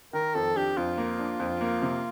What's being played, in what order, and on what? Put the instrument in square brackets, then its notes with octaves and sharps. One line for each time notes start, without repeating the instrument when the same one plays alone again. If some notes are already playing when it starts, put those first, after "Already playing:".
[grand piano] D#3 [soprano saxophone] A#4
[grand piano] F2 [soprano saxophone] A4
[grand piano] D4 [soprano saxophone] G4
[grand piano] F2 [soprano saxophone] F4
[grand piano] A#3
D4
F2
A#3
C3